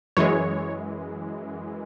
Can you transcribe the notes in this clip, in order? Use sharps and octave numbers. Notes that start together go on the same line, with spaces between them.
F#2 E3 G#3 C#5